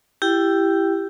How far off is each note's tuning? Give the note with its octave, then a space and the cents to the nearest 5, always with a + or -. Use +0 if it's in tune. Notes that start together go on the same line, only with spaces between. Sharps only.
E4 +15 G4 +0 G5 +0